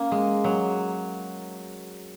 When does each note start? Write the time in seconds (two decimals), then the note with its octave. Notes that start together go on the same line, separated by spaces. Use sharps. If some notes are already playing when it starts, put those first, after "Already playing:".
Already playing: A#3 C#4
0.12 G#3
0.44 F#3